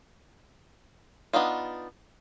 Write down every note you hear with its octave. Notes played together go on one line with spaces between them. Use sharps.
B3 D4 D#4 F4